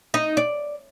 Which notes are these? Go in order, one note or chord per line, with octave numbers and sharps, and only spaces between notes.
D#4
D5